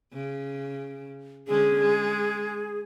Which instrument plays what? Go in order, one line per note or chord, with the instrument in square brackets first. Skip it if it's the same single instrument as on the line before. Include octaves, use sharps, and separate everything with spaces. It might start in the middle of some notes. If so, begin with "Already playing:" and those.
[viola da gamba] C#3
[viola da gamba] D3 G#3 C#4 [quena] G#4
[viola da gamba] G#3